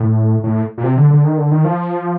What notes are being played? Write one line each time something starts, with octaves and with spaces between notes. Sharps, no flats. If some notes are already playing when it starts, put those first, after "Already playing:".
Already playing: A2
A2
A#2
C3
D3
D3
D#3
D3
D#3
F3